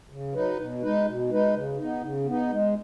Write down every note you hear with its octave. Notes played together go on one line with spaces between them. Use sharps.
C#3
F#3 D#4 B4
B2
G#3 D#4 B4
B2
G#3 D#4 B4
C#3
B3 D#4
C#3
B3 D#4
G#3